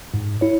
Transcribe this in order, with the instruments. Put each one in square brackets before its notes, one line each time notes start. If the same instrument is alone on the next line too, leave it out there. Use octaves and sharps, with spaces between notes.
[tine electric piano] G#2
E4 C#5